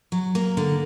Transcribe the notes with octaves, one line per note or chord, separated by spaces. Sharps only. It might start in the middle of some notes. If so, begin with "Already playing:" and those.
F#3
A#3
D3